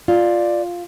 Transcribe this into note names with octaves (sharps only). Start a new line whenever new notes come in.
F4 D5